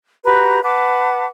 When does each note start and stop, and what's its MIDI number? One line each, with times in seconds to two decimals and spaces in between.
0.24 0.60 66
0.24 0.60 67
0.24 0.60 71
0.24 0.60 82
0.63 1.26 71
0.63 1.26 78
0.63 1.26 81
0.63 1.26 86